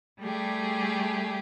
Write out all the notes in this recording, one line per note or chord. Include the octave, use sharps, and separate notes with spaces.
G3 A3 G4 G#4